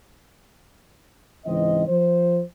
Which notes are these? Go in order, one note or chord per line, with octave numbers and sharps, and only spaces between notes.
C#2 G#2 E3 C4 D#5
F3 C5